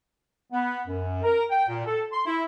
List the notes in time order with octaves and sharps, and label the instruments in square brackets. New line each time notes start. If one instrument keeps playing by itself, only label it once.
[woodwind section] B3
F#2
A#4
G5
A#2
A4
C6
E4